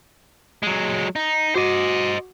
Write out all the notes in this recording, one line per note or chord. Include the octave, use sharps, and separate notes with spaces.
F#3 G#3
D#4
F#4 C5 D#5 D6